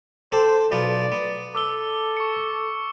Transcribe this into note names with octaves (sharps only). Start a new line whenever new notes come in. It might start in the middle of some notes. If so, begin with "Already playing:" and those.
C4 A4 C5 D6
B1 B3 F4 D5
B3
A4 D6 E6 G7
C#6 C#7